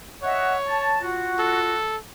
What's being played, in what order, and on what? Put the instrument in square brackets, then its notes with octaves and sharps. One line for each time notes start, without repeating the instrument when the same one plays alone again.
[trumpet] C#5 [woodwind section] D#5 E5 F#5
[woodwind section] A5
F4 F#4
[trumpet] A4